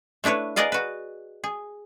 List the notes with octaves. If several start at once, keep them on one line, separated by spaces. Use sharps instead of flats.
A3 D4 E4 B4 C#5
G#4 A#4 B4 D5 D#5 F5
F#4 B4
G#4